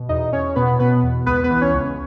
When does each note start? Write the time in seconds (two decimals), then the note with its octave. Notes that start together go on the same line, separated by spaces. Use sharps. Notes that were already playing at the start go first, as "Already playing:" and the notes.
Already playing: B2
0.09 E2 D#4 D#5
0.33 E2 C#4 C#5
0.56 B2 B3 B4
0.79 B2 B3 B4
1.03 E2
1.26 C#2 B3 B4
1.44 B3 B4
1.50 E3
1.61 C#4 C#5
1.74 C#2